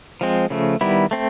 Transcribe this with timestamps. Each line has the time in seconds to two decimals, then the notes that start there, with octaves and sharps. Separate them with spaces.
0.21 F3 G#3 C4
0.50 C#3 F3 A3
0.81 D#3 G3 B3 E4
1.11 A3 C4